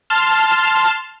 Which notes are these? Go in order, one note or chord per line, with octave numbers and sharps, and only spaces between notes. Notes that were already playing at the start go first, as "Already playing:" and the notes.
A5 C6 F6